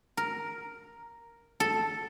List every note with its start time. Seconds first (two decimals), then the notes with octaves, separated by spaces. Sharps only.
0.17 A#4
1.60 A4